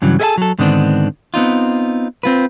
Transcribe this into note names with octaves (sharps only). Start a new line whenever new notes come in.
G2 C#3 E3 F#3
G#4 A4 D#5 E5 G#5 A5
F#3 A4
G#2 D3 D#3 B3 C4 D4
B3 C4 D#4 F4
C4 F4 B4